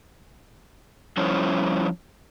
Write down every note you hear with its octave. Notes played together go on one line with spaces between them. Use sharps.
F3 G3 C#4 E4 C5 C#5